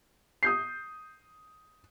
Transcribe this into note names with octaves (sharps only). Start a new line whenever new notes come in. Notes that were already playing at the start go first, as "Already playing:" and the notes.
D#6 G6 C7